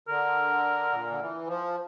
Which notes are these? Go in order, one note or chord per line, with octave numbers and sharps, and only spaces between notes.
D3 A#4
A#2
D3
E3
F3